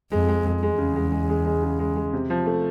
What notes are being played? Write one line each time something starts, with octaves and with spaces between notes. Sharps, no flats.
F2 G#3
G#3
G#3
E2 G#3
C#3
G#3
G#3
G#3
G#3
C#3
G#3
G#3
C3
F3
A3